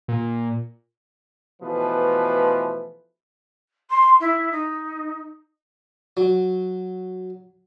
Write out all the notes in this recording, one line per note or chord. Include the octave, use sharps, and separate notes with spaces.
A#2
B2 E3 F3 A3 B4
C6
E4
D#4
F#3